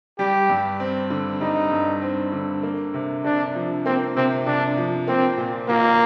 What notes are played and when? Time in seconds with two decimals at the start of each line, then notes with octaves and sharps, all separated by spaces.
0.19 G3 G4
0.50 G2
0.80 C4
1.10 D3
1.41 G3 D#4
1.72 G2
2.02 C4
2.32 D3
2.63 A#3
2.94 C3
3.24 C3 D4
3.55 F3
3.86 A#3 C4
4.16 C3 C4
4.46 C3 D4
4.77 F3
5.08 A#3 C4
5.38 A#2
5.68 A#2 A#3